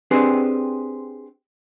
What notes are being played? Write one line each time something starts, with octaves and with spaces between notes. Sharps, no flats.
C4 D4 G4 G#4 B4 C5